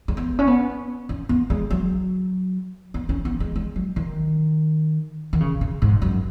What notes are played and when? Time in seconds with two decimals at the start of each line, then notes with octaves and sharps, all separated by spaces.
0.08 G#3
0.17 B3
0.39 C#4
0.47 B3
1.09 C#4
1.29 B3
1.50 G#3
1.71 F#3
2.94 B3
3.09 C#4
3.25 B3
3.40 G#3
3.56 G#3
3.76 F#3
3.96 D#3
5.33 D#3
5.40 C#3
5.61 C#3
5.82 G#2
6.02 F#2